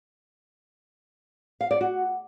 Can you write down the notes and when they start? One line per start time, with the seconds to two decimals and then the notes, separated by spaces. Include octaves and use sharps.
1.61 F5
1.71 D5
1.81 F#4